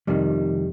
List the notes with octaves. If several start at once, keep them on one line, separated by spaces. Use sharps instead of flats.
F2 C3 D#3 G3